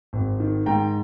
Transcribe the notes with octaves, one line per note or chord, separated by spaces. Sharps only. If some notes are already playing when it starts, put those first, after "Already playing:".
G#1
D#3
G#2 G5 A#5